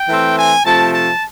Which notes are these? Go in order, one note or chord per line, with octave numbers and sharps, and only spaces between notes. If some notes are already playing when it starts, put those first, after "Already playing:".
Already playing: G5
E3 A3 C4
G#5
C3 F3 A3 A5
A5